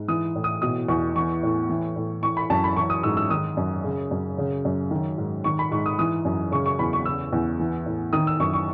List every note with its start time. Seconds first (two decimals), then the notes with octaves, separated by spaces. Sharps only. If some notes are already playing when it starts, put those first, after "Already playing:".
Already playing: G#2
0.08 E3 D#6
0.36 A2
0.44 D#6
0.62 B2 D#6
0.88 E2 C#6
1.16 E3 C#6
1.43 A2
1.69 E3
1.96 A2
2.23 E3 C#6
2.37 B5
2.50 F#2 A5
2.64 B5
2.77 E3 C#6
2.90 D#6
3.03 G#2 E6
3.17 E6
3.30 D#3 D#6
3.57 F#2
3.84 C#3
4.11 F#2
4.38 C#3
4.65 F#2
4.91 D#3
5.18 G#2
5.44 D#3 C#6
5.59 B5
5.71 G#2 C#6
5.86 D#6
5.99 E3 D#6
6.25 F#2
6.52 C#3 C#6
6.66 C#6
6.79 E2 B5
6.93 C#6
7.05 C#3 E6
7.33 E2
7.59 E3
7.86 A2
8.13 D#3 D#6
8.27 E6
8.40 F#2 C#6
8.53 C#6